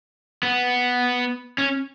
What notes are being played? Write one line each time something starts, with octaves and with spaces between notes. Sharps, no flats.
B3
C#4